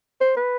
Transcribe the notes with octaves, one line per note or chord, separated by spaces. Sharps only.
C5
B4